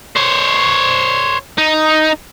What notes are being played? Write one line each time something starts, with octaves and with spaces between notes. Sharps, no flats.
C5 C#5
D#4